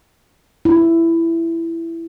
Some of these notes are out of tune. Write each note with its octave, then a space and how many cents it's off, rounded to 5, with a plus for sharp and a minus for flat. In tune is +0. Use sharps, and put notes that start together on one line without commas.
E4 +10